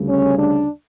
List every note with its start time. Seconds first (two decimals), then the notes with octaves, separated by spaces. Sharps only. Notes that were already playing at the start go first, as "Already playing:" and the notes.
Already playing: D2 C#3 G3
0.08 C#4
0.37 D4